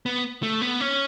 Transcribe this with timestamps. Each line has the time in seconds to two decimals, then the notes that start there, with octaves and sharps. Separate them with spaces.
0.06 B3
0.43 A3
0.61 B3
0.80 C#4